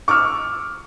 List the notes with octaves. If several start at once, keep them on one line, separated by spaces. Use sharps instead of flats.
C#6 D6 E6 F6